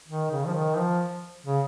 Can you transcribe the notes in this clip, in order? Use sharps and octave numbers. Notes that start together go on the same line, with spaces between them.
D#3
C#3
F3
D#3
F3
C#3